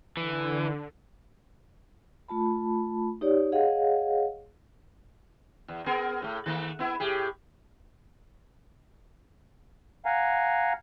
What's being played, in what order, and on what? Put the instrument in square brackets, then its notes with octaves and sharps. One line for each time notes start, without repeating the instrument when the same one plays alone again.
[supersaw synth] D3 [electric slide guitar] E3
[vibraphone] A3 F4 A5 B5
D#4 G4 C#5 D5
G#4 C#5 D#5 F5 F#5
[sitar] E2
B3 G#4 A#4
A2 A3
D#3 A3 A#3
B3 E4
A2 G4 G#4
[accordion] F5 F#5 G#5 A#5